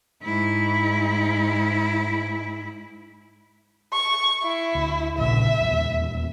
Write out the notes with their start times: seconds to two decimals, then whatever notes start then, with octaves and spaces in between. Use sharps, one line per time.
0.23 G#2 E4
3.93 C#6
4.43 E4
4.75 D2
5.18 A#1 A#2 C#3 E5
5.59 D#1 E2